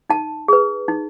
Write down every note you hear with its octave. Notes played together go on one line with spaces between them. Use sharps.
D#4 A5
G#4 B4
D#4